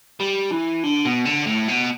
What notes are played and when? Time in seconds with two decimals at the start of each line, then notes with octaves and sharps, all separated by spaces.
0.21 G3
0.52 E3
0.83 D3
1.05 B2
1.26 D3
1.47 A2
1.68 B2